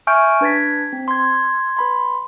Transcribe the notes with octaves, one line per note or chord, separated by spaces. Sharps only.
E5 G#5 C#6 F6 G6 D7
D4 B4 G#6 A6 B6
C4
C6 G#6
B4 B5 C6